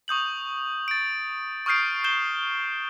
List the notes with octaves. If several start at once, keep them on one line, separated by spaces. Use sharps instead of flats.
C#6 D#6 G6 F#7
A6 D7
C#6 D#6 F6 G6 C7 D7
G6 E7 G7